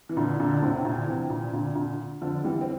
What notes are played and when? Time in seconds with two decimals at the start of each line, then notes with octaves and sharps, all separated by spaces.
0.09 E3
0.17 A#2 D3
0.40 A#2 D3
0.54 D3
0.62 A2 C3
0.85 A#2 D3
1.07 C3 E3
1.30 A#2
1.53 A#2 D3
1.75 A#2 D3
2.22 D3 F3
2.44 E3 G3
2.61 C4